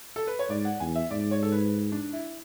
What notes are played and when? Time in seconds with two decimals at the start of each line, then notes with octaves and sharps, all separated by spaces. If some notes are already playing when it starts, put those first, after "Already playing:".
0.16 A4
0.27 B4
0.39 C#5
0.49 G#2 D5
0.65 F#5
0.80 E2 G#5
0.95 E5
1.11 G#2 D5
1.31 C#5
1.43 A4
1.52 B4
1.92 D4
2.13 E4